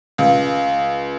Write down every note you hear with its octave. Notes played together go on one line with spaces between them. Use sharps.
C#2